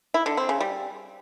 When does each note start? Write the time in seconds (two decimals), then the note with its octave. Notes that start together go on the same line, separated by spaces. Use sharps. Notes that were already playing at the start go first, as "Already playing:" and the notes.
0.14 E4
0.26 D3
0.37 C4
0.49 C#3
0.60 G3